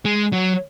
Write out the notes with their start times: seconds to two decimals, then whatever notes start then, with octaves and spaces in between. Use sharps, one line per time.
0.05 G#3
0.33 F#3